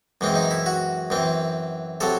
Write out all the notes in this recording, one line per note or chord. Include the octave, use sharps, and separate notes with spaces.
F#2 E3 G#3 C4
D#4
E4
F#4
F#2 E3 C4
C3 F#3 A4